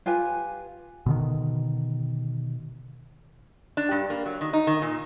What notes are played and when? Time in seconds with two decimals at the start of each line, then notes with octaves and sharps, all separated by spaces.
0.06 F4 G4 B4 G#5
1.06 B2 D3 D#3
3.77 D4
3.91 G2
4.10 A#3
4.26 F#3
4.41 D#3
4.53 D#4
4.67 D#3
4.82 A#2